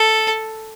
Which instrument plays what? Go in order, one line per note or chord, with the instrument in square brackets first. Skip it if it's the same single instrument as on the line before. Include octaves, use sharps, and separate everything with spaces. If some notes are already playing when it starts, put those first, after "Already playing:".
Already playing: [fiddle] A4